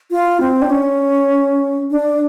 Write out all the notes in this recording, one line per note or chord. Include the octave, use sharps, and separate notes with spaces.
F4
C4
D4
C#4
D4